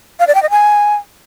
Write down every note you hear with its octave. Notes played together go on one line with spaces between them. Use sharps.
F5
D5
G5
D#5
G#5